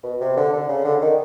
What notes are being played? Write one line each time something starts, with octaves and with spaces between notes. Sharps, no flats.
B2
C3
D3
D3
C#3
D3
D#3